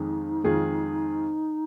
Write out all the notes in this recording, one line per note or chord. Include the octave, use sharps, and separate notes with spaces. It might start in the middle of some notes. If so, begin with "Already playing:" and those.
Already playing: F2 D#3 G#3 D#4
F2 D#3 G#3 F4 G#4